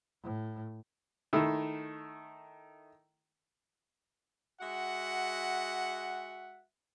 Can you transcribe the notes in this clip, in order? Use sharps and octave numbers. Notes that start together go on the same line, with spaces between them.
A2
D#3 A3 E4
G#3 F#4 E5 F#5